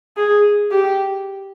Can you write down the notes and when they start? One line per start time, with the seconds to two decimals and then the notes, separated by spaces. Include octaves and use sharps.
0.17 G#4
0.71 G4